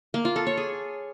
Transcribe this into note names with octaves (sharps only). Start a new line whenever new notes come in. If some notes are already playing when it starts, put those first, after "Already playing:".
A#3
F4
A4
C#5
G#4